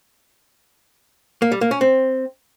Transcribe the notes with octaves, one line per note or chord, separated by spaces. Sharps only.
A#3
G3
A#3
C#4
C4